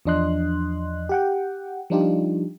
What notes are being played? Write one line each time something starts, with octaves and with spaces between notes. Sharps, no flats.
E2 F3 D4 D#5 C6 F#6
G4 F#5 G5
F3 G3 D4 D#4 F4 G4